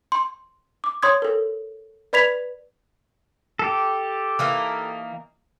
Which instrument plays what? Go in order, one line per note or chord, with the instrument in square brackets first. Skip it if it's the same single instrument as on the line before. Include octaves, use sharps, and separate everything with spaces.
[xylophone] C6
D6
C#5 C6 D#6 G#6
A4 A#4
B4 D5 B5 G#6 B6 F7
[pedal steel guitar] G4 A4
[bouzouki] E3 A#3 D#4